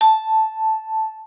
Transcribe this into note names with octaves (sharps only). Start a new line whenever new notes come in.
A5